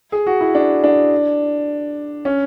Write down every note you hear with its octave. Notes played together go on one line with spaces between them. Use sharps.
G#4
F#4
E4
D4
D4
C#4